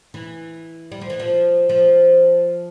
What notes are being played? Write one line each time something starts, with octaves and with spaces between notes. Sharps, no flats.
E3
G3
F3
E3
F3
F3